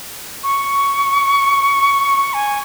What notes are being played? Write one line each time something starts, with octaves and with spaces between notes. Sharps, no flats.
C#6
G#5